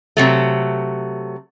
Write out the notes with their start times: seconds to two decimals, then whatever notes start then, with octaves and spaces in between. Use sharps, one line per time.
0.17 C3 F#3 A3